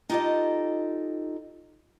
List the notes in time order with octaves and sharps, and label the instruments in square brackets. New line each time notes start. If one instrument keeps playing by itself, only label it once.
[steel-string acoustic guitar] D#4 F4 G4 A4 D#5